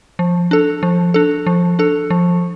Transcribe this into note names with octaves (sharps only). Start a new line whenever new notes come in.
F3
D4 A4
F3
D4 A4
F3
D4 A4
F3